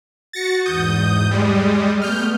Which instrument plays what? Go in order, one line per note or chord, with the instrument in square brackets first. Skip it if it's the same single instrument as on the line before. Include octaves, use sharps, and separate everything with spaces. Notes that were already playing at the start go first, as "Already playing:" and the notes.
[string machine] F#4 [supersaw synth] A6 A#6 C#7
[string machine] E2 G#2 [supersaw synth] D#6 G6
[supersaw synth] G3 G#3 [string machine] D#6
[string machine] A3 B3 [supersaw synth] F6 G6